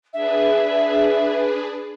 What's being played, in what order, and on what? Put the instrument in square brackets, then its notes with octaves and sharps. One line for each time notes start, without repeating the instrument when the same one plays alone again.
[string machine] D4 G#4 B4 [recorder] E5